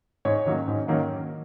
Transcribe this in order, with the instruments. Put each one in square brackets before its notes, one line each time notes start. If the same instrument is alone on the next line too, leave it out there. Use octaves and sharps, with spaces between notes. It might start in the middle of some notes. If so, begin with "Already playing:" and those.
[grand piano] G#2 C#5
D#3 F#3 A#3 C#4
G#2
D#3 F#3 A#3 C#4